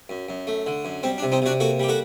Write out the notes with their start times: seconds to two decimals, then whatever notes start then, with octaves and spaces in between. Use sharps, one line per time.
0.09 F#2
0.29 F#2
0.47 A3
0.66 D3
0.85 F#2
1.03 G3 C4
1.18 D4
1.23 C3
1.32 C4 D#4
1.42 C3 D4 F#4
1.60 A#3 F#4 A4
1.79 G3 G4
1.88 F#4 A4